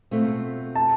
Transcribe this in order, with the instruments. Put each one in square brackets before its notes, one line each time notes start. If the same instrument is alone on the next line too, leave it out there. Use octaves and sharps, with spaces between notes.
[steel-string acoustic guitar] B2 A3 C4 F4
[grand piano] A5